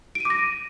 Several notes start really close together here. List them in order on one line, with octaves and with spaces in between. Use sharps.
D7 D#7 D6 A#6